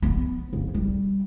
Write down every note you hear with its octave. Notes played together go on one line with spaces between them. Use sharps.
B3
F2
G3